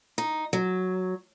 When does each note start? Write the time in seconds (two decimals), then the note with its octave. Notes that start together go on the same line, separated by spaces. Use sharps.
0.18 D#4
0.53 F#3